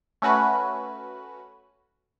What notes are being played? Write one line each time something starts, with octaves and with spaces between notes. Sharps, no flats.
A3 C#4 F#4 B4